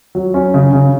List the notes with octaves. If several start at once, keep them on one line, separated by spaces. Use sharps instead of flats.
F#3
C#4
C#3
C#3